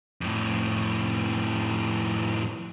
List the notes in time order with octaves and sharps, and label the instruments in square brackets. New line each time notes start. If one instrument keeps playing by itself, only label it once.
[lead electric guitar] F2 A2